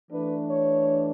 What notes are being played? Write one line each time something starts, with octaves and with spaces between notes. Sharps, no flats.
E3 A3 D4 B4
C#5